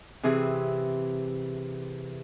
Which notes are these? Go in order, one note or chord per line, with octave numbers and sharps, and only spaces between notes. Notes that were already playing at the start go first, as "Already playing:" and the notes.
C3 E3 G#4